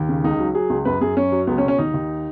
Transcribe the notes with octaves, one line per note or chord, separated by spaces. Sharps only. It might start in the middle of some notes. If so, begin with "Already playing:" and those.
Already playing: D#2
C#3
C#2 D#4
F#3
F#3 G#4
C#2
F#2 B4
F#2 G#4
F#2 C#4
F#3
C#2 B3
C#4
B2
C#4
D#2 D#4
D#2